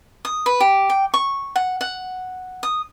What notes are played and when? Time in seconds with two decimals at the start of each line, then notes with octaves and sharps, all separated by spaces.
0.25 D#6
0.46 B4
0.60 G4
0.90 G5
1.14 C#6
1.56 F#5
1.81 F#5
2.63 D#6